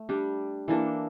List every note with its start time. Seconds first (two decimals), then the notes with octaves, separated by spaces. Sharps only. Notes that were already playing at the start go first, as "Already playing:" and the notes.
Already playing: A3
0.09 G3 D4 G4
0.68 E3 A#3 D4 A4